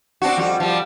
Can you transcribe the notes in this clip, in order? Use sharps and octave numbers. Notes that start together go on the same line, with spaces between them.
C4 D4 F#4
F2 G3 F#4
F3 G3